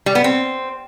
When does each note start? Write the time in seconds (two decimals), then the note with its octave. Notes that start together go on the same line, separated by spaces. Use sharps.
0.06 G3
0.15 B3
0.24 C4